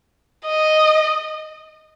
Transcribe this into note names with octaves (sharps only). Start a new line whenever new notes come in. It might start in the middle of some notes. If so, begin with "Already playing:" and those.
D#5